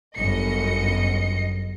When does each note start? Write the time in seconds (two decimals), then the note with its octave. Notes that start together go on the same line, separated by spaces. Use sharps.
0.18 G1 F#2 D#5 C#7